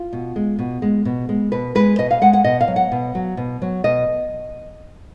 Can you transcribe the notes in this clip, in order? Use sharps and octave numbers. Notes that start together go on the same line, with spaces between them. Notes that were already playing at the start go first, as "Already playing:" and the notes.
Already playing: F4
B2
G#3
B2
G#3
B2
G#3
B2 B4
G#3 B4
B2 D#5
F5
G#3 F#5
F#5
B2 D#5
F5
F#3
F#5
B2
F#3
B2
F#3
B2 D#5